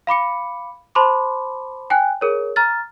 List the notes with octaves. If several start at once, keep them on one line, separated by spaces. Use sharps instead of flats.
F5 B5 D6 C#7
C5 A5 B5 C6 D6
G5 G#5 F#6
G#4 A#4 C#5
A#5 F6 A6